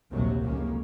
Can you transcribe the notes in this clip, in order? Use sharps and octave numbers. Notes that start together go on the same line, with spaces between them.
A#1 D#2 A2 C3 F#3
F1 C#2 A2 G#3 A#3 C#4